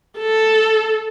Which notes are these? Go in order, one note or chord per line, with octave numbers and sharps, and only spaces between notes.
A4